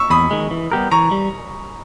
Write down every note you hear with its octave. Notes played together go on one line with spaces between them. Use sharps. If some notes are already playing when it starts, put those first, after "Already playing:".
Already playing: C#6 E6
E2 B5 D#6
D#3 G#3
E3
G3 B3 G4 A#4
E3 A#5 C#6
G3